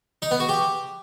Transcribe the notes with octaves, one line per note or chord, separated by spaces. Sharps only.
D#4
B3
F#4
G4